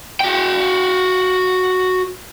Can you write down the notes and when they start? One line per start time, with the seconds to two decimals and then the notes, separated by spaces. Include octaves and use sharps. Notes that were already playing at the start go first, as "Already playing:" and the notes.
0.20 F#4 G5